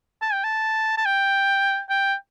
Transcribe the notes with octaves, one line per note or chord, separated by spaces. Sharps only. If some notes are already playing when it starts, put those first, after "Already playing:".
A5
G5
A5
A5
G5
G5